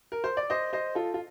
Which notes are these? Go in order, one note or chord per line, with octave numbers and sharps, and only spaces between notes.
A#4
C5
D5
C5 D#5
C5 D#5
F4 A4
F4